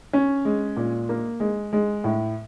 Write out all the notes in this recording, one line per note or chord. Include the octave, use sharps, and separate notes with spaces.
C#4
G#3
A#2
A#3
G#3
G#3
A2